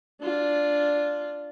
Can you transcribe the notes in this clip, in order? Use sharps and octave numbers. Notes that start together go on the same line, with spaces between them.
D4 F4